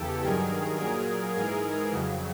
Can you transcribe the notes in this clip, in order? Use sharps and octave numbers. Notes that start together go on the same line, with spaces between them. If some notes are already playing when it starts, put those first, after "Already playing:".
Already playing: E2 C#3 E3 G4 A4
G2 D#3 F#3 G#4 A#4
A#2 F#3 G#4 A#4
G#2 E3 G#4 A#4
F2 C#3 F#3